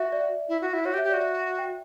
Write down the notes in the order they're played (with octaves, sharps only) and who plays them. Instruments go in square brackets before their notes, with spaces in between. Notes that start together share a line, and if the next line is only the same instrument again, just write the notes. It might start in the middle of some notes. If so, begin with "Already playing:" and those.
Already playing: [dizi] F#4 [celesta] E5
[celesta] D5
[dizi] E4
F#4
E4
[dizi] F#4 [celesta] C#5
[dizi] G4
[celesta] E5
[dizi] G4
[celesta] D5
[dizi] F#4
[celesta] E5
F#5
G5